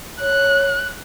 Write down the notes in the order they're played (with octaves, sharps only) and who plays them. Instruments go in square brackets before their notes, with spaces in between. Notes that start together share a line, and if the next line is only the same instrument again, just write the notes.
[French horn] C#5 [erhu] F#6